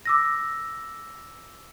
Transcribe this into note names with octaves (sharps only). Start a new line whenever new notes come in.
D6 E6 A#6